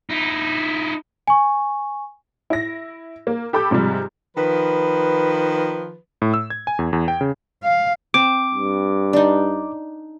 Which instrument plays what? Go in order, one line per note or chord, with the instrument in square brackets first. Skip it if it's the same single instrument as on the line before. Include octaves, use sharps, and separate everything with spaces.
[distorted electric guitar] D#4 E4
[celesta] G#5 C#6
[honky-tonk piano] E4 A#6
A#3
G4 A4 B5 D6 G6
G#2 C3 F3 G3
[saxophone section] D#3 F3 B4
[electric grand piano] A2
E6
G#6
G#5
E2
E2
G5
C#3
[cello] F5
[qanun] C4 [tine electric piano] D6
[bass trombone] G2
[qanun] D4 D#4